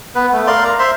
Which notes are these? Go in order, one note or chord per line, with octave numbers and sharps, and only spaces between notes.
B3 B4
A3
A#4 D5 F5 C6
A#5
C5 E5 C6